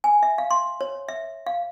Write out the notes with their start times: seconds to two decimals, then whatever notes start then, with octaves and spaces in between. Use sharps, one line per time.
0.04 G#5
0.23 E5
0.38 F5
0.51 C6
0.81 C#5
1.08 E5
1.47 F5